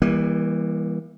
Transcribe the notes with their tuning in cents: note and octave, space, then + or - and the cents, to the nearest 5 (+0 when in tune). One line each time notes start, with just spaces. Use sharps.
E3 +0 G3 +35 A#3 +35